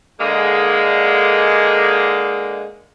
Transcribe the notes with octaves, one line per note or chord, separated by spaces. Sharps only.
D3 G#3 A#3